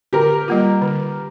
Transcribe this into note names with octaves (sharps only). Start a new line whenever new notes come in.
D3 G4 A#4
G3 A#3 F4
D3